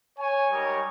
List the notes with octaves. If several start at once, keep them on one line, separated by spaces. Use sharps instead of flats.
C#5 G#5
G3 G#3 D#4 A#4 C#5 D#5